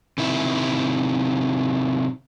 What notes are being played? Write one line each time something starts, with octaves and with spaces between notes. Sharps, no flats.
C3 D#3 E4